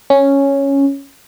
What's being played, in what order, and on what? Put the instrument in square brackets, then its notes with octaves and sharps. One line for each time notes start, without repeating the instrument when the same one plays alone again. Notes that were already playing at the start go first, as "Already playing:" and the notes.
[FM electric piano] C#4